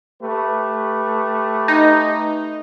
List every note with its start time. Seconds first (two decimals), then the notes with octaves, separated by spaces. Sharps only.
0.22 A3 G4 B4
1.68 D#4